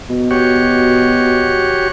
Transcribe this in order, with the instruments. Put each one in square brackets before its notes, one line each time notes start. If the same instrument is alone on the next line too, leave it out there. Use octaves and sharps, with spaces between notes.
[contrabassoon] B2
[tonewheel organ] F#4 G4 C#5